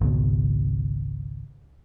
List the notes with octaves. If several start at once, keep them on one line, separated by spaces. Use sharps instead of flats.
G#1 C#2 B2